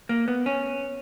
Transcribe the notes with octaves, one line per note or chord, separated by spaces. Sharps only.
A#3
B3
C#4